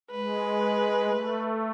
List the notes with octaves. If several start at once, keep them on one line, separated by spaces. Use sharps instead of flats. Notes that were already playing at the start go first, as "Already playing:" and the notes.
G#3 B4
A3